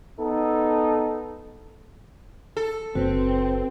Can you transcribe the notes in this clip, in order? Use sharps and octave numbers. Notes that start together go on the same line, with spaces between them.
B3 D#4 A4
A4
F#1 C4 F#4 B4